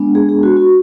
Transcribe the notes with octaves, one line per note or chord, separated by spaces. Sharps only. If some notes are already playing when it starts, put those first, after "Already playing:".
Already playing: G#3 B3 D4
G#4
G#4
F#4
F#4